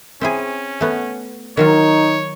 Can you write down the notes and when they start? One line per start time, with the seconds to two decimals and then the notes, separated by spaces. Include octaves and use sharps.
0.21 C4 C#4 E4 G#4
0.81 A3 B3
1.57 D#3 F#3 D#4 F4 C#5